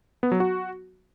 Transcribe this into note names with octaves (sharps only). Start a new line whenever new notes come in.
B3
F#3
F#4